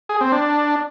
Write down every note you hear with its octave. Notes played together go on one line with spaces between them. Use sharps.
G#4
C4
D4